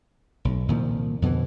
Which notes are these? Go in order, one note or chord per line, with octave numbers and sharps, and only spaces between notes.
B1
C2 A#2 D#3 F3
F2 B2 D3 E3